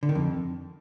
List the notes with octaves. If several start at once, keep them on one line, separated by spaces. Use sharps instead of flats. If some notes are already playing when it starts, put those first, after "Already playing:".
D3
D#3
F2